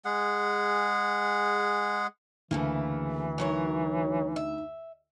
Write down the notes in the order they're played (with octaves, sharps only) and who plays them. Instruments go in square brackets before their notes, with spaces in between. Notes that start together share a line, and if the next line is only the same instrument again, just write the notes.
[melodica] G#3 G#4 F#5
[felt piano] D2 [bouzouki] C#3 A3 A#3 [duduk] E3
[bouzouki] F#3 A#4 C#5 [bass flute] D#4
[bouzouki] E5